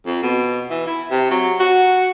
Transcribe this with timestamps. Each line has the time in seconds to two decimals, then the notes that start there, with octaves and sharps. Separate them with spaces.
0.06 F2
0.23 B2
0.70 E3
0.87 E4
1.10 C3
1.31 F#3
1.60 F#4